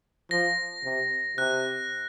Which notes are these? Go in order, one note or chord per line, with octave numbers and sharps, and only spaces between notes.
F3 A#6
C3
C3 F#6